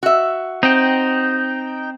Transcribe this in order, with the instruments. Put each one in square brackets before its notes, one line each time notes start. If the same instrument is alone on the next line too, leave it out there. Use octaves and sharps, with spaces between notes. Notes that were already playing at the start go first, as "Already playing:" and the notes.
[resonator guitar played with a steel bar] F#4 E5
[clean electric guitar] C4 [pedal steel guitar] D#4 G5